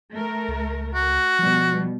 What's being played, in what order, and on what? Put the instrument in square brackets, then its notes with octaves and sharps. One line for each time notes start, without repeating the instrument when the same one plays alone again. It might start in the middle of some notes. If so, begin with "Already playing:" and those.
[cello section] A3 A#4
[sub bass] C#2
[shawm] F#4
[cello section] B2 G3 [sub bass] F3